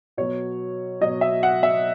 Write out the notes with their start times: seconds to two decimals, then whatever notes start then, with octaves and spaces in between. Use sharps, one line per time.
0.17 B2 F#3 C#5
1.01 F#3 D#5
1.04 B2
1.21 E5
1.43 F#5
1.63 E5